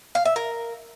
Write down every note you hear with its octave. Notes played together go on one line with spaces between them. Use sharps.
F5
E5
A#4